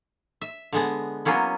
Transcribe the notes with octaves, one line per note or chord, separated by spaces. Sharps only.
E5
D3 G#3 B3
F#3 A#3 B3 C#4 E4